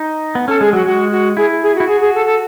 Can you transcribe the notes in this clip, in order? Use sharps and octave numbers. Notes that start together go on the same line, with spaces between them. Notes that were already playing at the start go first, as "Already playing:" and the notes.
Already playing: D#4
B3
C#4 A4
G#3 G#4
F#3 F#4
G#3 F#4
F#4
E4 G#4
G#4
F#4
E4
F#4 G#4
G#4
A4
A4